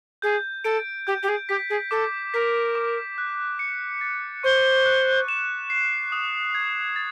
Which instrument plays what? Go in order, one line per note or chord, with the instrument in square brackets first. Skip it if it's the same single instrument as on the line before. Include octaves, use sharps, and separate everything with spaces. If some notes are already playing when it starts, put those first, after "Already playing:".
[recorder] G#4 [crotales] G6
[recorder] A4 [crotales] D7
[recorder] G4 [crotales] G6
[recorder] G4
G#4
[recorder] G4 [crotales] B6
[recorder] G#4
[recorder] A4 [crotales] D6
[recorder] A#4 [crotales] B6
[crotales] D6
F#6
C#7
A6
[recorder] C5 [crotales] C#6
[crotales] F#6
E7
C7
D#6
G#6
A6